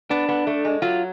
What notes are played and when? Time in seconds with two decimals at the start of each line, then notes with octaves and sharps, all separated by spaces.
0.10 B3 D4
0.29 B3
0.47 A3
0.65 G#3
0.82 F#3 F4